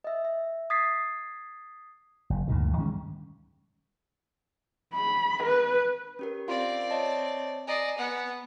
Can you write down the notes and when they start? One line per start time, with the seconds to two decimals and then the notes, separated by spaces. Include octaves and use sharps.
0.04 D#5 E5
0.25 E5
0.70 D#6 G#6 A6 B6 C7
2.30 F#1
2.48 D2 G2 A#2 D#3
2.78 D#3 G3 G#3 C#4
4.94 B5
5.43 B4
6.19 C#4 G4 A#4
6.48 C4 F4 D5 F5 C6
6.91 C#5 D#5 A5
7.67 D5 D#5 G#5 A#5 C7
7.98 B3 F#5